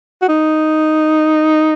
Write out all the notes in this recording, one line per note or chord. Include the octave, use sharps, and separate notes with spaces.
F#4
D#4